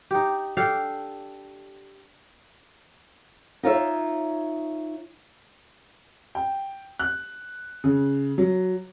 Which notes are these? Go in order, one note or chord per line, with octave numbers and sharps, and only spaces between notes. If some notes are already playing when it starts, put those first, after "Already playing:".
D#4 G4
D4 G4 A4 F5
D#4 F4 C#5 E5
G5
F#6
C#3
F#3